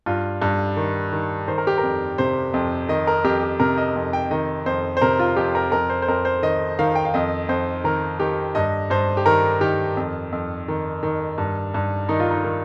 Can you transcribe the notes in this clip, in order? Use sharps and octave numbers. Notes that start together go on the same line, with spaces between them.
G2 F4
G2
D#3
D#3
D#3 C5
A#4
G4
A#4
F2
C3 C5
F2
D#3 D#5
A#4
F2 G4
G4
C3 A#4
D#5
F2
G5
D#3 D#5
F2 C5
C5
C3 A#4
F4
F2 G4
A#4
F2 A#4
C5
C5
F2 A#4
C5
D#3 D#5
D#3 F5
G5
F5
F2 D#5
F2 C5
D#3 A#4
D#3 G4
G2 D#5
G2 C5
G4
D#3 A#4
D#3 G4
F2
F2
D#3
D#3
G2
G2
D#3 D#4
F4
D#4
D#3